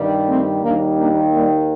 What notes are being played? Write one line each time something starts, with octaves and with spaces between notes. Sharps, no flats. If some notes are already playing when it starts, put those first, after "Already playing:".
Already playing: G2 D#3 G3
A3 C4
D#2 D#3 G3 A#3 D4
A#3 D4
G3 A#3